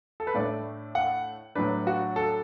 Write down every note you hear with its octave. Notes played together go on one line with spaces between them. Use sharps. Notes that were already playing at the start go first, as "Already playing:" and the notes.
A4
B4
A2 A3 D4 D5
F#5
A2 F#3 D4 B4
F#4
A4